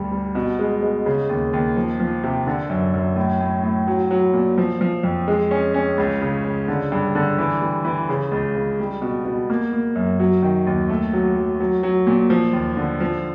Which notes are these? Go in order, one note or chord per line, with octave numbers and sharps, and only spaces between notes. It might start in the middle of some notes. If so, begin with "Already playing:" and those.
Already playing: D2 G2 G3
G3
B2
G#3
G#3
C#3
D#2
D#2
F3
F3
C3
D3
F#2
F#2
A2
A2
A2
F#3
F#3
A#2
F3
F3
F2
G#3
C#4
C#4
C#2
C#3
C#3
D3
G2
D3
E3
G3
E3
C#3
C#2
C#3
G3
B2
B2
A#3
A#3
F#2
F#3
D#3
D#2
A3
F#3
F#3
F#3
F#3
A#2
F3
D#2
D3
F3